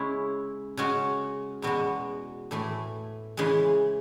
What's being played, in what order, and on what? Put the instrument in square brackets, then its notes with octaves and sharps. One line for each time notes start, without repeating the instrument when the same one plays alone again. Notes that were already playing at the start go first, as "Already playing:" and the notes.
Already playing: [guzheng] C#3 G#3 C#4 E4
C#3 G#3 C#4 F#4
E2 B2 G#3 B3 F#4
A2 E3 A3
C#3 E3 G#3